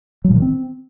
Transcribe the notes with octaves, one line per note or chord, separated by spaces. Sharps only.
F#3
A#2
D#3
C4